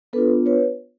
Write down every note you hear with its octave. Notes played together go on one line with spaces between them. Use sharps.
B3 D4 F4 A4 B4
B4 C#5